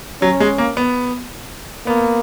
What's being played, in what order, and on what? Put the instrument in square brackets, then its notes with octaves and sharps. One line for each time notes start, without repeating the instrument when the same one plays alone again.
[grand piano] F#3 [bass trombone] C#4
[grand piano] G#3
A#3
B3
[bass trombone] A#3 [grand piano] B3